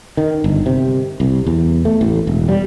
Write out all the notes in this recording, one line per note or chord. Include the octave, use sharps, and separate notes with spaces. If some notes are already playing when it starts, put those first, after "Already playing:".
D#3
G1
C3
C2
E2
A3
A1
E1
G3